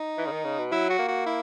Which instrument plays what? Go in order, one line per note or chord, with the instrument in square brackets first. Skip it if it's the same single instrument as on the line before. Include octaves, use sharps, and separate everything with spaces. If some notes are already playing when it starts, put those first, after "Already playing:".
Already playing: [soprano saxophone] D#4
[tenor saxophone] E3
C#3
D#3
C#3
B2
[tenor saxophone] F#3 [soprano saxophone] E4
[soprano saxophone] F#4
[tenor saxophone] A#3
[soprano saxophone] F#4
E4